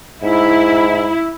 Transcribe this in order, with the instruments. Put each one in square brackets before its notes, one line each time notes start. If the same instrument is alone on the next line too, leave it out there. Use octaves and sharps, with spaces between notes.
[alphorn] G#2 [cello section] E4